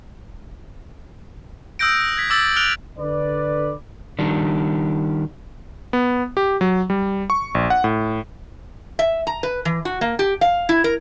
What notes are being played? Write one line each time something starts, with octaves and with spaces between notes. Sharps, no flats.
D#6 E6 F#6 G6 A#6 D7
G#6 B6
D6 E6 A6 F#7
F6 F#6 D7 F7
D3 B4 D5
D#3 G3 D4
B3
G4
F#3
G3
C#6
A#1
F#5
A2
E5
A#5
B4
E3
F#4
A#3
G4
F5
E4
A#4